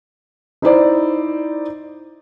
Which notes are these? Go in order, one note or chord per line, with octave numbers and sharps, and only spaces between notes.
D#4 E4 C5 D5